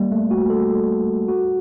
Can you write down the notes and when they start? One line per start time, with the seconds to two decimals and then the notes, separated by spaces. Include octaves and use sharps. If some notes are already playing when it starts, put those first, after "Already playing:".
Already playing: G3 A#3
0.12 A3
0.31 F#4
0.50 A4
1.28 F#4